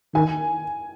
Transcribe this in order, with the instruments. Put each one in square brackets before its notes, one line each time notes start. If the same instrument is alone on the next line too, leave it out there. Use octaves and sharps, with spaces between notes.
[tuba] D#3 [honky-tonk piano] G#5